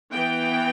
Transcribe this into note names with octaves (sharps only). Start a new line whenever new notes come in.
E3 B3 G5